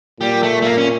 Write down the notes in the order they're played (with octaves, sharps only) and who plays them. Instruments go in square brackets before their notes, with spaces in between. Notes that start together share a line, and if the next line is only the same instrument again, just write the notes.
[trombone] A#2 [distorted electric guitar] G3
[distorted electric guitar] A3
A3
A#3
C#4